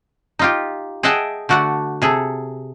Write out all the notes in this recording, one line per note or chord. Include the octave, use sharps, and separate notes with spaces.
D#4 F4 G4
G#4 D#5 E5 F#5 G5 A5
D3 A3 F#4 D5 F#5
C3 G#4 A4